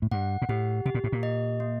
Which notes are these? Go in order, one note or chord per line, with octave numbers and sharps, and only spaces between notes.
A2
G2 F#5
A#2
A2 G4
C3 G4
A#2
A2
A#2
D#5
A#3